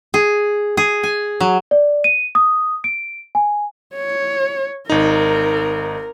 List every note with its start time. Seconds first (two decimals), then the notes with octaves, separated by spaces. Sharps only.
0.14 G#4
0.77 G#4
1.03 G#5
1.40 F#3
1.71 D5
2.04 D#7
2.35 D#6
2.84 D7
3.35 G#5
3.95 C#5
4.90 G#1 D#4 A#4